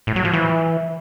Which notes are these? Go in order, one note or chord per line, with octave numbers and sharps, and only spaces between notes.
A2
F#3
F3
E3